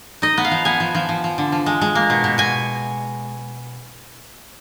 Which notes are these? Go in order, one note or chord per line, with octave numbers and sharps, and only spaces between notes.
D#4 D#5
B3
F5
F3
B3 G#5
F3
F3
F3
F3
D3
F3
G#3
G#3
A#3
B2
B2
B2 G#5